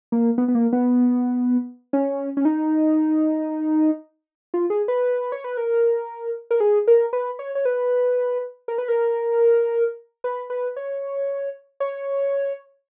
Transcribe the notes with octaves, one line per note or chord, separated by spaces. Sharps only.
A#3
B3
B3
A#3
B3
C#4
C#4
D#4
F4
G#4
B4
C#5
B4
A#4
A#4
G#4
A#4
B4
C#5
C#5
B4
A#4
B4
A#4
B4
B4
C#5
C#5